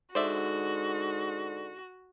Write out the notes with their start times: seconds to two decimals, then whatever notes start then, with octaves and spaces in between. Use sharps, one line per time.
0.15 G#2 D3 F#4 C5 D5 E5